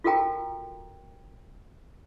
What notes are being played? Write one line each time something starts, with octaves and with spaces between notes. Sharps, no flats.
F4 F#4 A4 A#4 G5 A#5